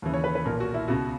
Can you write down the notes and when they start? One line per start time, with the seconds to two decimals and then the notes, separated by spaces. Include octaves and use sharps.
0.02 D#2 C#3 E3
0.14 C#5
0.24 B4
0.35 B4
0.45 B1 A#2 A#4
0.60 F#4
0.74 E4
0.88 C#2 B2 F#4